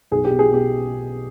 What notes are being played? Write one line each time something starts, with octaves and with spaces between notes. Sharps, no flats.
B1 G#4
G4
B2
G#4
B2 G4